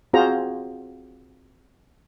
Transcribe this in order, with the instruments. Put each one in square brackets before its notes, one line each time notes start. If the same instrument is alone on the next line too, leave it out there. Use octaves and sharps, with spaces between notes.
[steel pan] C4 F4 F#4 G#4 C5 A#5